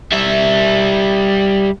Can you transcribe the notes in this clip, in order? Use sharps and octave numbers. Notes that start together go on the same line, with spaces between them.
G3 E5